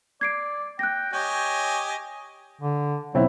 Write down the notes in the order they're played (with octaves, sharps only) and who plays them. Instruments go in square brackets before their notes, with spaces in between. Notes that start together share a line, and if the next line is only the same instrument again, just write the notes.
[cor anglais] D5 [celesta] G#6 C7 D7
[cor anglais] G5 [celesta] F#6 A#6
[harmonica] G4 D#5 G#5 [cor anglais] C#5 [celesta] G6
[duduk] D3
[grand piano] B2 C4 E4 [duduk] F#3